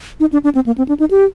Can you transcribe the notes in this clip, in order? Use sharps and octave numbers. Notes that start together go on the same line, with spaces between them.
D#4
D4
D4
C4
A#3
C4
D4
D#4
G4